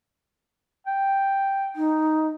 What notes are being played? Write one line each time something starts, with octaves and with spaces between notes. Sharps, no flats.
G5
D#4